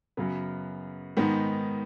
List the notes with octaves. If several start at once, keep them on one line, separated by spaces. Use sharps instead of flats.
F#2 C#3 F#3 B3
G#2 D#3 B3 D#4